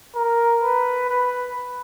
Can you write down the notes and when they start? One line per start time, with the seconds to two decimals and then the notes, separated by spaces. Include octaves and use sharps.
0.15 A#4
0.62 B4
1.09 B4